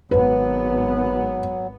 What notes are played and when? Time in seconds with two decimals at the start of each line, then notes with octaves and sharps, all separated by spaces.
0.11 G#1 F#3 B3 B4